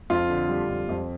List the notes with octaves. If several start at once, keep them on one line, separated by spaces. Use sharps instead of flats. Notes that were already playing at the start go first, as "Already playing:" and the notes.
F2 F4
D3
G3
F2
F2